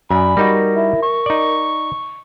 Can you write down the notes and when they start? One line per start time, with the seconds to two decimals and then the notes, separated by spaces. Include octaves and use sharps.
0.11 F#2 D5 G#5 B5
0.37 G3 D#4 F#4 A#4
0.75 E4
1.03 C#6
1.26 D#4 D5